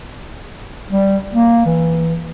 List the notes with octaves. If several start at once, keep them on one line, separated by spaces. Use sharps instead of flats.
G3
A#3
E3